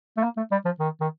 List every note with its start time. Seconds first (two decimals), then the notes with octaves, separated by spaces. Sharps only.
0.17 A3
0.23 A#3
0.37 A3
0.52 G3
0.65 F3
0.80 D#3
1.01 D#3